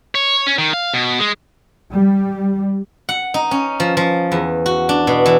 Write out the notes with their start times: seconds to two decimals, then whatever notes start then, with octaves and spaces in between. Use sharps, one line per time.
0.15 C#5
0.47 C#4
0.58 D#3
0.74 F5
0.94 B2
1.19 G#3
1.93 G3
3.09 F#5
3.34 D#4
3.51 C#4
3.80 F3
3.97 F3
4.32 E2
4.66 F#4
4.89 D4
5.07 B2
5.26 E3